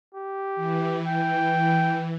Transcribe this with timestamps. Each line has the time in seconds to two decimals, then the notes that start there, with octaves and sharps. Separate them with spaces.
0.15 G4
0.55 E3
1.07 G5